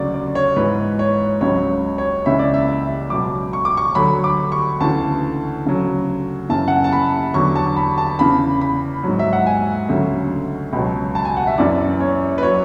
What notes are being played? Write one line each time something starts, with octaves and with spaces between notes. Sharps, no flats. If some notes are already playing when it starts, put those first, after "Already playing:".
Already playing: D2 C#3 F#3 D5
D5
C#5
G#2 E3 B4
C#5
C#2 C#3 F#3 C#5
C#5
C#2 C#3 E3 E5
D5
E5
E5
C#2 B2 F#3 D6
C#6
D6
C#6
D2 D3 F#3 B5
D6
C#6
D2 C#3 E3 A5
D2 C#3 F#3
F#2 C#3 E3 A5
F#5
G#5
A5
B5
E2 D3 F#3 C#6
A5
B5
A5
E2 C#3 E3 B5
B5
G#2 F#3
E5
F#5
G#5
D2 C#3 F#3 E5
C#2 B2 F#3
A5
G#5
F#5
E5
F#2 E3 D5
C#5
B4
F#3 C#5